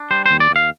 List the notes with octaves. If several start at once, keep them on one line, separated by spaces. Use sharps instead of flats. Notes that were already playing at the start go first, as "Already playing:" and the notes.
Already playing: D4
G3 C5
C5
D#2
D5
D#2 F5